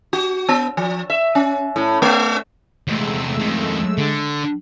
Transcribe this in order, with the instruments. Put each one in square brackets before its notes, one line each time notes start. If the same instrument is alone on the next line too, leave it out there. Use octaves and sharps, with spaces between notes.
[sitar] F#4
B3
F3
E5
C#4
A2
A3
[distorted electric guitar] E2 C3 [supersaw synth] G#3 A3 E6
[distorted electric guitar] F2 D#3
D3